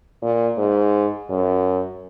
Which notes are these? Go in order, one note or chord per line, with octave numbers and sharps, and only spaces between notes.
A#2
G#2
F#2